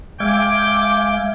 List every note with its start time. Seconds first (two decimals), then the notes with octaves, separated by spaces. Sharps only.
0.20 G#3 E5 F5 G5 G#5 D6